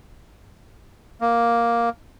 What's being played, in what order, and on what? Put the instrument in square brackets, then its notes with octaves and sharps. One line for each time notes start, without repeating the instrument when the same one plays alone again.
[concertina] A#3